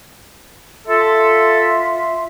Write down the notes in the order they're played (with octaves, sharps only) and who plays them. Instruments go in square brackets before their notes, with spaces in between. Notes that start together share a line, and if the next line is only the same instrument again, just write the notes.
[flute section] F4 E5 C6 [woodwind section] A4